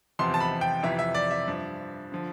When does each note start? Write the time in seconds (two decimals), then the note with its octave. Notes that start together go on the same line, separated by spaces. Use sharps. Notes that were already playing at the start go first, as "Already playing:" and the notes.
0.19 E2 C3 F3 C6
0.34 A5
0.40 B5
0.61 G5
0.83 F2 C3 E3 E5
0.99 E5
1.15 D5
1.31 E5
1.48 G2 F3
2.12 D3 F3